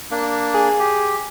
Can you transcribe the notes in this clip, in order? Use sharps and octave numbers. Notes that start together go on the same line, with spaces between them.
A#3 D4
G#4
G4